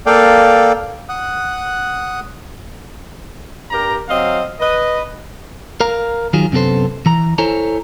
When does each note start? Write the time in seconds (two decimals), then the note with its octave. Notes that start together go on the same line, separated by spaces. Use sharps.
0.06 A#3 A4 D5 F5 G5
1.09 F#5 D#6 F#6
3.71 G2 G4 A#4 A#5
4.09 F#3 C4 D#5 F5
4.60 B4 D#5
5.80 A#4 F5 A#5
6.33 D#3 F#3 F4 G#4
6.52 F#2 C3 B3 A4 C5
7.06 E3 A#5
7.38 E4 A4 C5 C#5 G#5 A#5